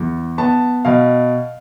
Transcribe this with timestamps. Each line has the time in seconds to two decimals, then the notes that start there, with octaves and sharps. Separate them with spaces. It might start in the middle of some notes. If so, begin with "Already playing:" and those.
Already playing: E2
0.38 B3 A5
0.85 B2 F5